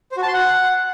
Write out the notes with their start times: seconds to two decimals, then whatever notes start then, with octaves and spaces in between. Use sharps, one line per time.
0.12 C5
0.17 F#4
0.23 A5
0.28 C6
0.33 F#5